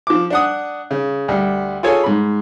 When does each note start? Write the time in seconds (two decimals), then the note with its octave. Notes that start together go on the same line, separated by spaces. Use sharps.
0.07 F3 D6
0.30 D4 F#5 D#6
0.91 C#3
1.28 D2 G3
1.83 F4 G#4 A4 C#5 G#5
2.04 G#2 B5